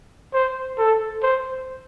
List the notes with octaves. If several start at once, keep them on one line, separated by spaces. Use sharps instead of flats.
C5
A4
C5